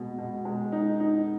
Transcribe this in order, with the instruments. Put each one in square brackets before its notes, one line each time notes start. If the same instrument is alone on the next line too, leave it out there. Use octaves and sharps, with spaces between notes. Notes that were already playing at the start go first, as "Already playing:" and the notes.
Already playing: [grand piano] B2 G#3
B2
G#3
D#4
D#4